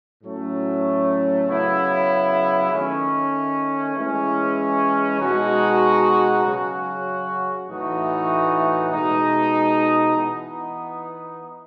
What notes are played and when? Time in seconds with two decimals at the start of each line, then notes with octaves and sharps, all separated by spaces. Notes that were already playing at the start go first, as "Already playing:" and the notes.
0.22 A2 F#3 A3 C#4
1.46 C#3 F#3 B3 E4
2.71 D#3 A3 C#4
3.95 E3 G#3 C#4 E4
5.19 B2 G#3 D#4 F#4
6.43 C#3 F#3 C#4 F#4
7.67 A2 E3 A3 D#4 F#4
8.91 B2 G#3 D#4
10.15 E3 B3 D#4